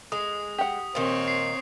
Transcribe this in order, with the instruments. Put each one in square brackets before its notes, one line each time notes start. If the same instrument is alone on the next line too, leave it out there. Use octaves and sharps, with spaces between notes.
[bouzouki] G#3 [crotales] D#6
[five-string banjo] G4 F#5
[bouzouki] A#2 D#3 [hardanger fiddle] C4 C#5
[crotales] C7